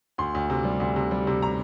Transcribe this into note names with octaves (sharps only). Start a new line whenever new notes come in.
D2 C6
D2
C3
G3
D2
C3
G3
C3
A#5